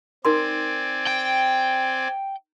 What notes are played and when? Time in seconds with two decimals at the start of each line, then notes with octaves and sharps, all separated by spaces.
0.25 C4 D#4 A#4 D5 G#5 C6
1.07 G5